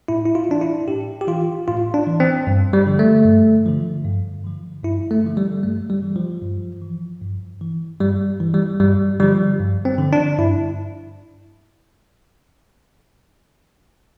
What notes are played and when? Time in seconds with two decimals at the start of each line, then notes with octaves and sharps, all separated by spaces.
0.08 A2 E4
0.25 E4
0.35 F4
0.49 E3 D4
0.61 E4
0.88 A2 G4
1.21 G4
1.27 E3 F4
1.68 A2 F4
1.94 D4
2.07 E3
2.20 C4
2.47 G2
2.73 G3
2.87 D3 F3
2.99 A3
3.25 G2
3.66 D3 F3
4.05 G2
4.44 D3 F3
4.84 G2 E4
5.11 A3
5.24 D3 F3
5.37 G3
5.63 G2 A3
5.90 G3
6.03 E3
6.16 F3
6.42 G2
6.82 E3
7.21 G2
7.61 E3
8.00 G2 G3
8.40 E3
8.54 G3
8.80 G2 G3
9.20 D3 F3 G3
9.60 G2
9.85 C4
9.98 D3 F3
10.13 D4
10.38 G2 E4